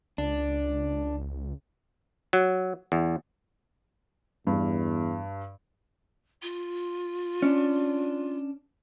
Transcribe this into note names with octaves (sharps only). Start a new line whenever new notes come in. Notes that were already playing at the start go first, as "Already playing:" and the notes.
C#2 D4
F#3
E2
E2 G2
F4
C#4 D4